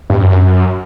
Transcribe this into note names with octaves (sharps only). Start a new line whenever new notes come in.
G2
F#2
F#2